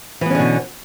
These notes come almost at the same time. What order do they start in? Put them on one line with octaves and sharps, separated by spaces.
E3 B3 C#4 D3 B2